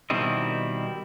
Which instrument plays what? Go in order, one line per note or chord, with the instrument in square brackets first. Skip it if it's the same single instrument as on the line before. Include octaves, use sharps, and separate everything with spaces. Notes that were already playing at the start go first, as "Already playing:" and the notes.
[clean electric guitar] B2 D#3 G3 C4 E4 D#5